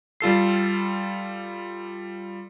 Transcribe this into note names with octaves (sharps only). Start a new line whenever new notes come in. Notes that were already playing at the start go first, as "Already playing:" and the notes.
G3 F4 A4 C7